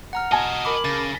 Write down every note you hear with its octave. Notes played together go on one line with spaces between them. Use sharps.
F#5 A#5 F6
F#4 D#5 G#5 A5
A#4 B5 D6
C#3 A6 A#6